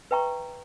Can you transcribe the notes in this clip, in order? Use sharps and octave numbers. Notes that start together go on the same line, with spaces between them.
B4 E5 G5 A#5 C#6